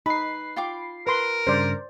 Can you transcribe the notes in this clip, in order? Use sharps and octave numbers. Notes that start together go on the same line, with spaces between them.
D#4 B4 B5 C7
F4 G5 D6
A#4 B4 C6
G2 C#3 C5 D5